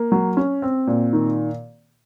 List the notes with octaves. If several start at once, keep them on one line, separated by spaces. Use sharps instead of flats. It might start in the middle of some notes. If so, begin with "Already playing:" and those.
Already playing: A#3
F#3
C#4
C4
A#2
D#3